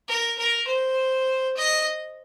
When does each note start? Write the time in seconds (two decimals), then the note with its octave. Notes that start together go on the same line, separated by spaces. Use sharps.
0.08 A#4
0.38 A#4
0.67 C5
1.57 D#5